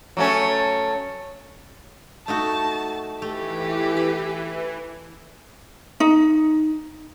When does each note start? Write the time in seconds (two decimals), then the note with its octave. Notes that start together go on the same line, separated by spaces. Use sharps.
0.17 F#3 A3 C#4
2.28 A3 D#4 F#4 A5
3.22 E3 A3 G4
3.97 B5
6.00 D#4